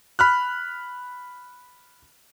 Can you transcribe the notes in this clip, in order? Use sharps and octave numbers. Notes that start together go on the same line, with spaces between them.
B5 F6 F#6